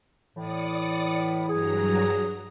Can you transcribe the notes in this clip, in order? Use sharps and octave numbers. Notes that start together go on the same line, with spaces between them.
A2 E3 D5 D#6 C#7
G2 F#3 G#4 A#5